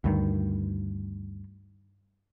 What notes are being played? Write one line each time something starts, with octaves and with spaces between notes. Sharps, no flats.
D2 G2 D#3